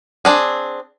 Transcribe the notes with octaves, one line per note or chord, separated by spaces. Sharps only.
C4 D4 G#4